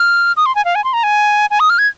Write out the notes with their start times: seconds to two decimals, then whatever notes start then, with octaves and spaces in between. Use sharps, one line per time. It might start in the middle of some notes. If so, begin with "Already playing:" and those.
Already playing: F6
0.37 D#6
0.46 C6
0.55 G#5
0.65 F5
0.75 G#5
0.84 C6
0.93 A#5
1.03 G#5
1.51 G#5
1.60 D#6
1.70 F6
1.79 G#6